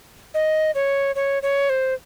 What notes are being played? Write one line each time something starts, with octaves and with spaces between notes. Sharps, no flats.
D#5
C#5
C#5
C#5
C5